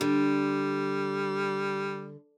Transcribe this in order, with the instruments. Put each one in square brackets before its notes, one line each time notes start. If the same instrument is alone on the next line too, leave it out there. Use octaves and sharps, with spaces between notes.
[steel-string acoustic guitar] D3 [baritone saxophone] G3